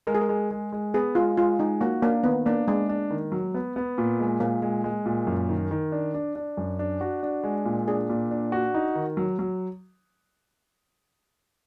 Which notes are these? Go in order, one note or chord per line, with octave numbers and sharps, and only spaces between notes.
G#3 A#4
G#4
A#4
G#3
G#3
G#3
B3 G#4
G#3 F4
G#3 F4
G#3 D#4
A#3 F#4
A#3 D4
D#3 B3
A#3 D4
G#3 D4
D4
D#3
F#3
B3
B3
A#2
G#3
A#2 A#3
G#3
G#3
A#2
F#2
D#3
D#3
D4
D4
D4
F#2
D4
F#4
D4
G#3
A#2
D4 G#4
A#2
D4
F#4
D#4
D#3
F#3
F#3